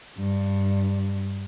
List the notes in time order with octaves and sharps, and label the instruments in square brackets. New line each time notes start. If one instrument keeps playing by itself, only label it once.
[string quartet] G2